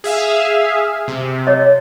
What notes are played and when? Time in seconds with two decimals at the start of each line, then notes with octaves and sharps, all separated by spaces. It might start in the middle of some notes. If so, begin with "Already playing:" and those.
0.04 G#4 E5 F5
1.08 C3
1.47 C#5 D#5